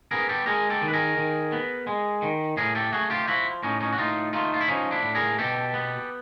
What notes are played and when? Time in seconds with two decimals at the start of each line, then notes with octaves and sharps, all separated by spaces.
0.11 B3 G#4 A#4
0.29 G4 A4
0.46 G#3 G#4 A#4
0.70 G4 A4
0.81 D#3
0.88 B4
0.93 G#4 A#4
1.17 D#3
1.52 B3
1.87 G#3
2.22 D#3
2.57 A2 G#4 A#4
2.75 G4 A4
2.92 A3 F#4 G#4
3.10 F4 G4
3.28 F3 E4 F#4
3.63 A2 C#4 D#4
3.81 C#4 D#4
3.93 F#4
3.98 A2 D#4 F4
4.33 A3 D#4 F4
4.54 F4
4.61 E4
4.68 F3 C#4 D#4
4.91 D4 E4
5.03 A2
5.15 G#4 A#4
5.38 B2 G4 A4
5.74 B3